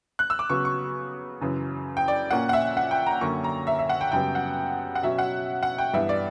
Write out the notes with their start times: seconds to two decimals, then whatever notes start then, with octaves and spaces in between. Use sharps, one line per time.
0.19 F#6
0.30 E6
0.39 D6
0.50 C#3 F#3 B3 C#6
0.65 C#6
1.41 F#2 C#3 E3
1.97 G5
2.08 D5
2.31 A#2 A#3 C#4 F#5
2.49 F#5
2.53 E5
2.77 F#5
2.91 G5
3.06 A#5
3.21 F#2 D3 A#3 C#4 C#6
3.44 A#5
3.67 E5
3.79 E5
3.89 F#5
4.01 G5
4.12 F#2 C#3 G3 B3 G5
4.35 F#5
4.95 F#5
5.03 B2 F#3 C#4 E5
5.19 F#5
5.63 F#5
5.78 G5
5.93 G2 E3 B3 E5
6.09 D5